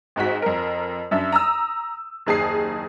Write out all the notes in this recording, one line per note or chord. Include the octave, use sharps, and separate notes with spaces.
G#1 G#2 F#4 B6
F2 A#4
F#2 D4 E5
A#5 D#6 E6
F#1 D#2 G#4 A5 D#6 C7